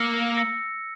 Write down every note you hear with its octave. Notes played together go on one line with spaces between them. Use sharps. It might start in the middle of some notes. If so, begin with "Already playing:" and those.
Already playing: A#3 E6 A#6 C#7
E6 A#6 C#7